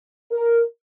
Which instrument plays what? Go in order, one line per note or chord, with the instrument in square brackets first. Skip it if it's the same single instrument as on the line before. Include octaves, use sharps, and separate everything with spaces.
[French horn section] A#4